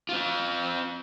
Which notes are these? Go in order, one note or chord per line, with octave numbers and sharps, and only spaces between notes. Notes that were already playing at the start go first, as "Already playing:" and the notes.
C4 F4